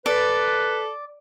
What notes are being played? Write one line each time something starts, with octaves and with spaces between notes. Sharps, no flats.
A4 B4 D5